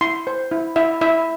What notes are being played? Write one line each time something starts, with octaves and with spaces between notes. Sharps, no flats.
E4 C6
C5
E4
E4 E5
E4 E5